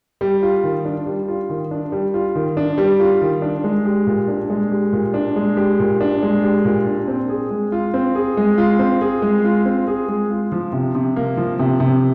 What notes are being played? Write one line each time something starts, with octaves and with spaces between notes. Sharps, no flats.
G3
F4
D#3
D4
G3
F4
D#3
D4
G3
F4
D#3
D4
G3
F4
D#3
D4
G#3
G4
A#2
D4
G#3
G4
A#2
D4
G#3
G4
A#2
D4
G#3
G4
A#2
D4
C4
G#4
G#3
F4
C4
G#4
G#3
F4
C4
G#4
G#3
F4
C4
G#4
G#3
F4
F3
C3
C3
A#3
F3
C3
C3